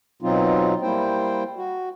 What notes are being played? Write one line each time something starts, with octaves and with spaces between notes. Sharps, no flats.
B2 F#3 C4 D#4 F4
G3 A#3 E4 C5 G5
F#4